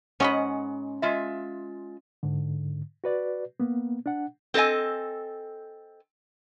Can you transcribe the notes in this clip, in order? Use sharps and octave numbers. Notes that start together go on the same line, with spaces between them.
G#2 G#3 C#4 D#5 F#5 B5
G#3 F4 E5
G#2 D3
F#4 B4 D5
A#3 B3
D4 F#5
C4 A4 B4 D#5 G#5